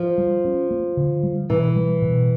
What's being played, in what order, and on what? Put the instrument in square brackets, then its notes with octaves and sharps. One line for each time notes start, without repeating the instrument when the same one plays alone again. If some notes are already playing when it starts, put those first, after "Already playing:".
Already playing: [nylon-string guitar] F3
[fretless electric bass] G3
C#4
A#3
D3
G3
[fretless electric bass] B2 [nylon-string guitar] E3
[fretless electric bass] G3
B2